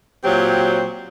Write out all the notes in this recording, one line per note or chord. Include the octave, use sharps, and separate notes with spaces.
A#2 F#3 C4 G4